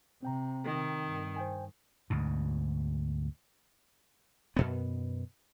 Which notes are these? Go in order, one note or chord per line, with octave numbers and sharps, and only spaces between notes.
C3 C4 G5 A#5
D#3
G2
C5 G5 G#5
D2 G#2 B2
F#2 B2 B3